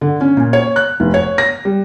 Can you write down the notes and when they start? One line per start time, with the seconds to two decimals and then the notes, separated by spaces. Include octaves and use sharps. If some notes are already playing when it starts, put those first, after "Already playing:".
0.01 D3
0.21 C#4
0.37 A#2
0.53 C#5
0.76 F#6
1.00 F1
1.14 C#5
1.38 A#6
1.65 G3